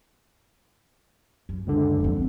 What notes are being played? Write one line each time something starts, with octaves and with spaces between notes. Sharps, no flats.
F#2
C#2 D3
F3 C4